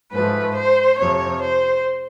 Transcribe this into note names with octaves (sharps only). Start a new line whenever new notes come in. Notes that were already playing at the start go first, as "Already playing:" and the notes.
G#2 F3 A3 B4
C5
F2 C3 F3 C#5
C5